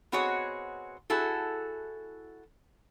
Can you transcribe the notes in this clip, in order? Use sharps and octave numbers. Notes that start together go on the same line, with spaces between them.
B3 C4 F#4 G#4 C#5 D#5
E4 F#4 G#4 A4